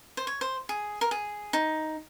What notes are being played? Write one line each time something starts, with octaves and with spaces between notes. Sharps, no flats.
C5
C#5
C5
G#4
A#4
G#4
D#4